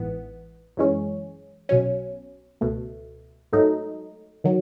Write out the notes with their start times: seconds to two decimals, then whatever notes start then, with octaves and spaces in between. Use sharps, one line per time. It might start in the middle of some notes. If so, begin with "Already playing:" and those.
Already playing: A1 G#2 E3 B3
0.77 F#2 E3 G#3 C#4
1.69 B1 B2 F#3 C#4
2.61 C#2 B2 A3
3.53 G#2 F#3 A3 D#4 A4
4.44 D#3 F#3